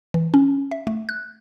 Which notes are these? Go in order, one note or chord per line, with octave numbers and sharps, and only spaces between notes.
E3
C#4
E5
A3
F#6